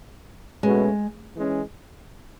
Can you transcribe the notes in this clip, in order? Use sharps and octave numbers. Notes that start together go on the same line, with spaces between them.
B2 G#3 A3 C#4 F#4 B4
E3 G#3 C#4